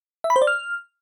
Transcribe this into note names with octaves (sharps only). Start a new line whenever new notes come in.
E5
B5
C5
D5
F6